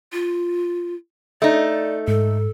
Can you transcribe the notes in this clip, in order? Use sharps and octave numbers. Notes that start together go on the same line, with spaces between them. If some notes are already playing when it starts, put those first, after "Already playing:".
F4
A3 D#4 D5
G#2 A4